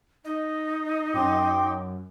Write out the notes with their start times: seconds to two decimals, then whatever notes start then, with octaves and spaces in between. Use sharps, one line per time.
0.25 D#4 D#5
1.14 F#2 G5 C6 D6